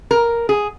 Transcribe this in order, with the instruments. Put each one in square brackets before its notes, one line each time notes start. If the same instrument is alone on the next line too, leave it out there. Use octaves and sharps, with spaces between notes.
[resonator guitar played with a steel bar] A#4
G#4